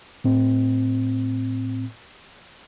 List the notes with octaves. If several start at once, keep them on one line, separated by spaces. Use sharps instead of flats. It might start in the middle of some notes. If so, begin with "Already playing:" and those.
A2 C4